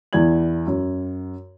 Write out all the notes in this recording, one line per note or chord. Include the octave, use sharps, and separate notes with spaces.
E2 E4 D5 G#6 F#7
F#2